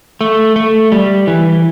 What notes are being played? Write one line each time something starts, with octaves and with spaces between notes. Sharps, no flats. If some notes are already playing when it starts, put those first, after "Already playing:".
A3
A3
G3
E3